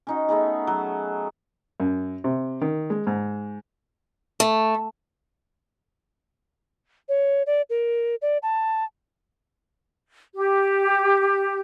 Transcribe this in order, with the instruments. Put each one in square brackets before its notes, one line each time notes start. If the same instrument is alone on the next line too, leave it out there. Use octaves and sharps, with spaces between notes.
[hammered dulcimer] C#4 D#4 F#4
A3 B3 D#4 G#4
F#3
[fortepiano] F#2
C3
D#3
G#3
G#2
[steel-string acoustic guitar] A3
[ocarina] C#5
D5
A#4
D5
A5
[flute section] G4